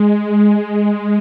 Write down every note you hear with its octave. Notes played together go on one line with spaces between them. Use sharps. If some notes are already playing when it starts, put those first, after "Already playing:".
Already playing: G#3